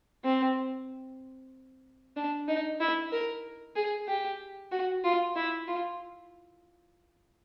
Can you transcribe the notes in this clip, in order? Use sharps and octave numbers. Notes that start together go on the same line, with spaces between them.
C4
D4
D#4
E4
A#4
G#4
G4
F#4
F4
E4
F4